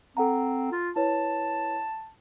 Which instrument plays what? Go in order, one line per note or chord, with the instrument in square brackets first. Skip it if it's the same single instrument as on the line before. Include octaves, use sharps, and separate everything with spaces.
[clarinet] C4 [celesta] A4 F#5 A#5
[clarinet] F4
[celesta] E4 B4 C#5 [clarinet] A5